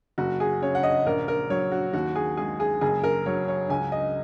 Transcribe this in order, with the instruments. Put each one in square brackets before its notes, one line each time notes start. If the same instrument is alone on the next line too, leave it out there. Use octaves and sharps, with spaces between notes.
[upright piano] F#1 F#4
G#4
C#3 C#5
F#5
D#5
A#1 A#4
A#4
F#3 C#5
F#4
D#2 F#4
G#4
G#3 G#4
G#4
F#1 G#4
A#4
F#3 C#5
C#5
C#2 G#5
D#5